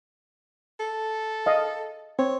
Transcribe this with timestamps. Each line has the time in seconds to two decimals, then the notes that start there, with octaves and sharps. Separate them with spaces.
0.80 A4
1.46 D#5 F5
2.19 C4 C#5